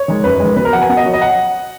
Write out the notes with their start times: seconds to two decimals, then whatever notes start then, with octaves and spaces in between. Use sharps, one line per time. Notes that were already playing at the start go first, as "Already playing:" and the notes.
Already playing: C#5
0.08 D#3 G#3
0.24 F#2 B4
0.40 D#3 G#3
0.56 B2 B4
0.65 A#4
0.73 F#3 F#5
0.82 G#5
0.89 B2 F#5
0.97 D#5
1.06 F#3 C#5
1.14 D#5
1.22 F#5